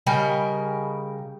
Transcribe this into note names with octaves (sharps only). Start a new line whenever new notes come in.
C#3 G3 A#4 D#5